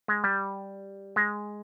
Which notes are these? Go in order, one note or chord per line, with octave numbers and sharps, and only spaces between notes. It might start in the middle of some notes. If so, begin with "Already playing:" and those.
G#3
G3
G#3